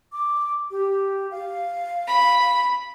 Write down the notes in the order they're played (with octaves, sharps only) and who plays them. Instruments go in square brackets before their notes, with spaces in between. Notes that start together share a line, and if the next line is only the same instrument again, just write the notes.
[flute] D6
G4
F5
[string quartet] B5